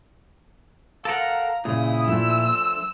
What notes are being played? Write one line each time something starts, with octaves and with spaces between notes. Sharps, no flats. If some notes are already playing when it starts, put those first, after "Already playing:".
A4 A#4 F5 F#5 A#5
A#2 C#3 E4 D#6
F3 A3 D4 E6